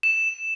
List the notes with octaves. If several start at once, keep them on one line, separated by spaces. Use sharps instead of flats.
E7